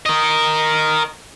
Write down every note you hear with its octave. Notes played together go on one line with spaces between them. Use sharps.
A#4 D#5